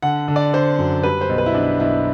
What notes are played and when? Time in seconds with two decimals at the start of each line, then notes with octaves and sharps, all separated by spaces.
0.03 D3 F#5
0.28 D3
0.36 D5
0.53 D3 C5
0.78 F#2
1.03 G3 B4
1.21 C5
1.29 B1
1.38 B4
1.46 E4
1.54 B1 D4
1.80 B1 E4